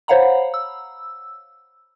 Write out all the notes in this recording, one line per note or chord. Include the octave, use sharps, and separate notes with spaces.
C5 C#5 F5 F#5 A#5 B5
E6